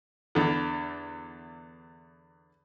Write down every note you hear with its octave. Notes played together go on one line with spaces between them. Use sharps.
E2 D3